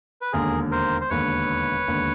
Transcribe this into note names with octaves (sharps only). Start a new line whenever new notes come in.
B4
E1 D#2 D3 G#4 A#4
A#4 C5
C5
E1 D#2 D3 B4 C#5
E1 D#2 D3